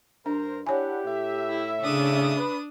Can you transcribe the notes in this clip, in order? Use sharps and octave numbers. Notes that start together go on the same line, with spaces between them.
G2 D4 A#4 C5
D4 E4 G4 C#5 F#5 G#5
A2 E5
E4
C#3 D4 D#6
B4